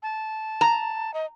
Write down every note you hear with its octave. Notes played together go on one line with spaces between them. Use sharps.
A5
A#5
D#5